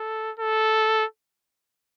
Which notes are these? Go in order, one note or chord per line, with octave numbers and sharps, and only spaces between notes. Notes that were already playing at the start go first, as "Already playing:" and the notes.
Already playing: A4
A4